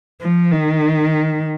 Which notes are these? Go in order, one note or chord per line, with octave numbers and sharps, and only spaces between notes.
F3
D#3